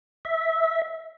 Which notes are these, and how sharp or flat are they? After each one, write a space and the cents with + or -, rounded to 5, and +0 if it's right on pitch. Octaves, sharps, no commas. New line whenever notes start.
E5 -15